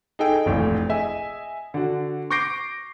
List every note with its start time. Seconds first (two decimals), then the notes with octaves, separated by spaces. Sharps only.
0.19 D#4 G#4 A4 G5
0.45 F1 A#1 A2 E3
0.89 G#4 D#5 E5 G#5
1.74 D3 F#4
2.30 C#6 D6 G6 A#6 C7 D7